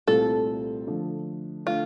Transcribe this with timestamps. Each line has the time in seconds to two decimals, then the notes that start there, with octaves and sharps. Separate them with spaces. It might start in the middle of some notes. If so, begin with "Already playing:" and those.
0.07 C2 A#2 A3 C4 F4 A4
0.87 D3 F3 A3
1.66 D3 A3 F4